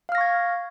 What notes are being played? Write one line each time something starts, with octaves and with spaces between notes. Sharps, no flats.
F5 C#6 F6 G#6 A#6